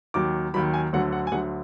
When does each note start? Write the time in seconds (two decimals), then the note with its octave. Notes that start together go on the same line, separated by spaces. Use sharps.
0.14 D#2 D#3 F#3 D6
0.54 D#2 D#3 F#3 B5
0.74 G#5
0.93 D2 D3 F#3 F#5
1.12 F#5
1.27 G#5
1.32 D2 D3 F#3 F#5